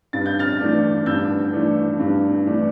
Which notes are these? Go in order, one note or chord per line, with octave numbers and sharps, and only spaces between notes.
G2 A6
G6
F6 A6
E3 A3 D4
G2 E6 G6
E3 A3 D4
G2
E3 A3 D4